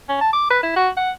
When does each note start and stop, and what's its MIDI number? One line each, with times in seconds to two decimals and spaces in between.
0.09 0.18 61
0.21 0.28 81
0.33 0.49 86
0.50 0.59 71
0.63 0.75 64
0.76 0.89 66
0.97 1.11 78